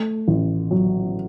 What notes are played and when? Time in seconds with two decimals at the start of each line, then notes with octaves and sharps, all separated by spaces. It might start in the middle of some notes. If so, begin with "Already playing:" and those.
Already playing: A3
0.28 A1
0.71 F#3